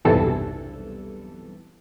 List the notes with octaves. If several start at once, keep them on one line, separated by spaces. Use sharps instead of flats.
B1 E2 G2 C3 E3 A4